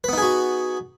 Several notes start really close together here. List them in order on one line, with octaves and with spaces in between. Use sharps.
B4 B3 D#4 G#4 F#4